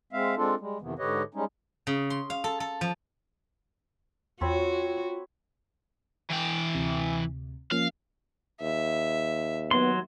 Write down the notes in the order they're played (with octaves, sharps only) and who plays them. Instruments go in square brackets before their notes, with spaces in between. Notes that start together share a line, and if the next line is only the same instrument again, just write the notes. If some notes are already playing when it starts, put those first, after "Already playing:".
[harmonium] G#3 C4 E5 F5
G#3 C4 D4 F4 A4
G3 G#3
F2 C3 D#3 E3 B3
G#2 D3 G4 B4 C#5 D#5
G3 G#3 C#4 D#4
[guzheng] C#3
C6
F5
A4
A4
F3
[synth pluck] E2 [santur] C4 C#5 B5 [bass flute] F4 [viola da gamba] F#4
[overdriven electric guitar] E3 G5
[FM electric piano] D2 C3
[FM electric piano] F3 A#3 C#4 [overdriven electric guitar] F5
[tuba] D#2 [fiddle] E5
[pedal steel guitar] F#3 C6 [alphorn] B3